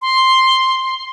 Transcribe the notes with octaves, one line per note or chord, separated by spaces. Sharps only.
C6